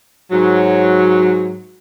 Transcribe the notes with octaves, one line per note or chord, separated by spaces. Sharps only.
G#2 F#3